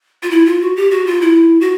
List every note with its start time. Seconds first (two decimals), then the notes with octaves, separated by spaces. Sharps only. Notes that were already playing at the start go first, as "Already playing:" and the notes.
0.23 F4
0.31 E4
0.46 F4
0.61 F#4
0.76 G4
0.91 F#4
1.06 F4
1.21 E4
1.61 F#4